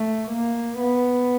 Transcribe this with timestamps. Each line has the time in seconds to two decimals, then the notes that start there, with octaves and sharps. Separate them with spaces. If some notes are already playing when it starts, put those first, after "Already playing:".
Already playing: A3
0.32 A#3
0.80 B3